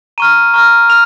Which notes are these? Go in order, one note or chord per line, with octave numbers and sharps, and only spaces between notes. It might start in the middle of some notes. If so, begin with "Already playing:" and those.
A#5 C#6 F6 D#7
A#5 C#6 F6
F6 F7